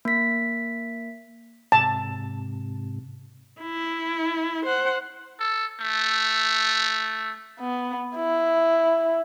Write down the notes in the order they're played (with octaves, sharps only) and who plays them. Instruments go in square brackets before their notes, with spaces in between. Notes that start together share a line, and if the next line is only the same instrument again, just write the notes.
[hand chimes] A#3 B6
[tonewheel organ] G#2 C3 [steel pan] A5
[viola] E4
C5 F#5
[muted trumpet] A4
A3
[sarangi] B3
E4